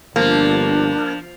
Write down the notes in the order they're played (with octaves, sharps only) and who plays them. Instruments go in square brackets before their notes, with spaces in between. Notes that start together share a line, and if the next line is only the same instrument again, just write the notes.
[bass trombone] G1 [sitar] F3 [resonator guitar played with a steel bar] A#3 [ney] D4